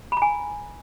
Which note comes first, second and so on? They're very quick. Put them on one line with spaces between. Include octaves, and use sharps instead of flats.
B5 A#5 G#5